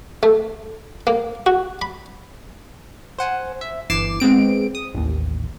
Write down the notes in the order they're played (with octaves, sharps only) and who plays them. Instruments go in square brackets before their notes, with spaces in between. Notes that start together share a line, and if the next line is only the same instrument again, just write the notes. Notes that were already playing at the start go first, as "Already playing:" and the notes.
[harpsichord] A3
A#3
F#4
B5
[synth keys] C5 F#5 G#5
E5
G1 E3 D6 C7 E7
G#3 B3 C4 D7
D#6
A1 D#2